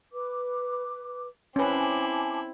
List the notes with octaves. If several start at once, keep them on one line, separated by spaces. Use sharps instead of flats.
B4 D6
C4 C#4 E4 B4 G#5 A5 D6